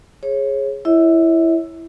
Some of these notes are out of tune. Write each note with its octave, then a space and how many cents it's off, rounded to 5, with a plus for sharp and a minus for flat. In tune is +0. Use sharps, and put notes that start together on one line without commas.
G#4 +0 C#5 -25
E4 +10 C#5 +0 E5 -40